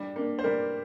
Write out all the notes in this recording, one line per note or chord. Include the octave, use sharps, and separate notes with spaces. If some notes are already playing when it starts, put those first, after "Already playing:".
Already playing: G3 D4
A#3 D4
C5
G3 A#4